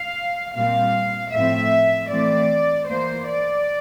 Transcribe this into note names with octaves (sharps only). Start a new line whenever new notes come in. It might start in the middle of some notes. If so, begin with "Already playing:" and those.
Already playing: F5
A#2 G3 C4 F5
A2 F3 C4 E5
E3 A3 C4 D5
E3 A#3 C5
D5